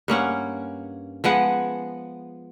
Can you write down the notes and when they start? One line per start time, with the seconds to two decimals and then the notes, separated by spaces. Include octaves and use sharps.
0.08 G2 A#3 C#4 F#5
1.24 F3 G#3 B3 F#5